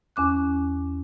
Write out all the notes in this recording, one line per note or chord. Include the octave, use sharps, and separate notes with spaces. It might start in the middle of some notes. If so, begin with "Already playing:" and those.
E2 C#4 D6 F#6